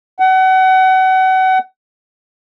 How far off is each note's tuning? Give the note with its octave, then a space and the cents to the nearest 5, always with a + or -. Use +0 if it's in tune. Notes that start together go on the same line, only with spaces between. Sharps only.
F#5 +30